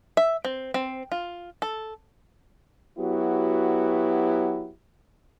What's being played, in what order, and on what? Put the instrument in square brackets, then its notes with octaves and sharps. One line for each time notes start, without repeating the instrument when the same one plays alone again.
[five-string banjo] E5
C4
C4
F4
A4
[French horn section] F#3 B3 E4 F#4 G4